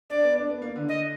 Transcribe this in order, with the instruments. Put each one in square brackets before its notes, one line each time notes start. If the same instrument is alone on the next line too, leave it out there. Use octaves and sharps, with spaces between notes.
[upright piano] D4 [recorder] D5
[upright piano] B3
D4
B3
A#3
D3
[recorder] D#5